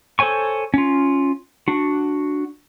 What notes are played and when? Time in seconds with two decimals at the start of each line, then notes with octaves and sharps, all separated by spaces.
0.19 A4 C5 C#5 G#5 C#6
0.74 C#4 F4
1.68 D4 F#4